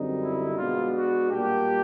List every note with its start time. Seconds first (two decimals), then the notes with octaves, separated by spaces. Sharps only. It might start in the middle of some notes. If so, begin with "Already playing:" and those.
Already playing: F#2 D3 G3 C4 D#4
0.22 E4
0.57 B2 G#3 B3 D4 F4
0.94 F#4
1.30 A#2 G3 A#3 D4 G4